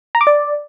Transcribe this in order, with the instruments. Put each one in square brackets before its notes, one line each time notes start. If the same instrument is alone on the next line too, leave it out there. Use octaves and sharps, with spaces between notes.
[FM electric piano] A#5
D6
D5